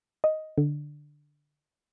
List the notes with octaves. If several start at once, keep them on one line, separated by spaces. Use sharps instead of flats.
D#5
D3